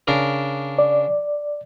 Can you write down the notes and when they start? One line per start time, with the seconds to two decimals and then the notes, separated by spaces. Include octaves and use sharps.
0.07 C#3 D4 A#4
0.79 D5